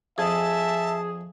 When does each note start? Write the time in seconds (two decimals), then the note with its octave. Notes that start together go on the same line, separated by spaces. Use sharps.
0.18 F2 G#4 E5 A5